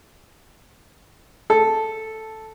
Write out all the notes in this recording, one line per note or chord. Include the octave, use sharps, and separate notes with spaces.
A4